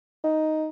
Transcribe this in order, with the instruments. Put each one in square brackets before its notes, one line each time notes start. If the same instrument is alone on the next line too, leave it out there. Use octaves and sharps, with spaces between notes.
[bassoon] D#4